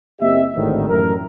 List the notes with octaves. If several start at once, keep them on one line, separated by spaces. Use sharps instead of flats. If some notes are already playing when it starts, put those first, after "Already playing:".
F#1 A#3 C4 G4 D#5 E5
G#1 D2 A2 D#3
A1 F#2 A2 E4 A#4